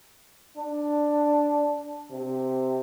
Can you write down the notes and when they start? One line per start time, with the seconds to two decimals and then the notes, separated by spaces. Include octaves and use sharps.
0.57 D4
2.11 C3